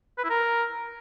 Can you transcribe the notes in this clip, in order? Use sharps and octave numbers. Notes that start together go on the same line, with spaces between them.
B4
E4
A#4